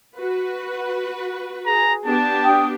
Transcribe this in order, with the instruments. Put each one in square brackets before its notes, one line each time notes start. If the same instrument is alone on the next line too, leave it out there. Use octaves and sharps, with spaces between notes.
[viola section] F#4 B4
[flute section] G#4 [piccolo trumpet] A#5
[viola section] B3 D4 G4 [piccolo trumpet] A5
[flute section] G5 D#6